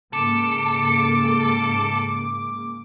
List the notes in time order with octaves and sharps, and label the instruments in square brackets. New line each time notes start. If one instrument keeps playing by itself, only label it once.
[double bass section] G#2 C#3 A#3 [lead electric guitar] A4 [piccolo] D6